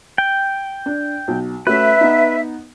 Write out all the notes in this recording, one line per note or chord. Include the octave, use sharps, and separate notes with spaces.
G5
D4
B1
A3 C#4 F#4 B4 E5
B3 D#4